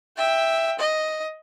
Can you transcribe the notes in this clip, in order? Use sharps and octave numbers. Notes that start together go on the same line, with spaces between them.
E5 G5
D#5